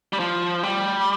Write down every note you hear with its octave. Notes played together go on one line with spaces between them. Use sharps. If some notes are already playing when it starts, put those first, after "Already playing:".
G3
F3
G3